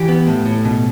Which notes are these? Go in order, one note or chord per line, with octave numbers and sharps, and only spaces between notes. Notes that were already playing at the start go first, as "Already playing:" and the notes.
Already playing: E3 G4
B3
A2
A2
B2